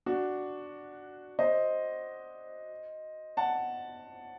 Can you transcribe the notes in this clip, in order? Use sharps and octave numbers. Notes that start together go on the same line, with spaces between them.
D4 F#4
C5 D#5
F#5 A5